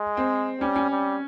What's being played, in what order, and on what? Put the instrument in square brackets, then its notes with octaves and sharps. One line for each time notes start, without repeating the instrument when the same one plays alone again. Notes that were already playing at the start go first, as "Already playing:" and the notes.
Already playing: [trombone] G#3
[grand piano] C4
[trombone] G3 [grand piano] C#4
[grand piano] C#4
[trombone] G3